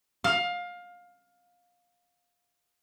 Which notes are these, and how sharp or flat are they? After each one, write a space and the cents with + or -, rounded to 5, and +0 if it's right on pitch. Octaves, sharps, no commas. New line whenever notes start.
F5 +20